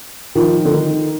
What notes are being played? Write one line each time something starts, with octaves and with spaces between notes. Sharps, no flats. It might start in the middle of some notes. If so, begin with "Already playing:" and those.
D#3 F3
D3
D#3